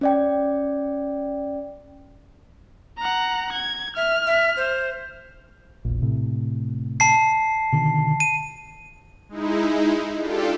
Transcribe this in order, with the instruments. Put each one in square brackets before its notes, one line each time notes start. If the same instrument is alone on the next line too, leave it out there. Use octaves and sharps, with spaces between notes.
[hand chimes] C#4 D5 G5
[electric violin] F#5 A#5
G#6
[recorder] E5 [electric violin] F6
[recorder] E5
C5
[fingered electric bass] E1 A#1
A2 C3
[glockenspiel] A5 C7
[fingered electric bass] B2 D3 D#3
[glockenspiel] D#7
[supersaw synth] G#3 D#4 E4
D4 F4 G4 A4